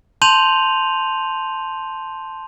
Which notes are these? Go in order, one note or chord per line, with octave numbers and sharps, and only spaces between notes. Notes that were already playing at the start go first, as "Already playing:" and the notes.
A5 C6 G6 D#7 F7 F#7